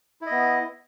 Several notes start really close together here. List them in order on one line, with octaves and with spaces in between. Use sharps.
E4 D#5 B3